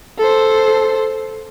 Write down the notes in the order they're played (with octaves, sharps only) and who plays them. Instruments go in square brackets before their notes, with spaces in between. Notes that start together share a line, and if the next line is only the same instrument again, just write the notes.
[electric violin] A4 C5